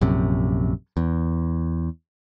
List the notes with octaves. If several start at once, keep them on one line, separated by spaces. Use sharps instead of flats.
A#1 F#2 C3
E2